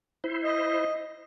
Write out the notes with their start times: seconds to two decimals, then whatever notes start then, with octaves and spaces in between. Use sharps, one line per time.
0.24 E4 C5
0.44 D#5